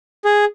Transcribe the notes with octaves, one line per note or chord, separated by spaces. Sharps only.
G#4